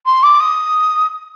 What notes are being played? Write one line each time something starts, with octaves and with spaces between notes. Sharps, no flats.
C6
D6
D#6